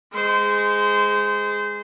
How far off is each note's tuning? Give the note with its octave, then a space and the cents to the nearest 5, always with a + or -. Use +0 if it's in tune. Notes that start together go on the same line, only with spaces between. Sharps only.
G#3 +0 C5 -25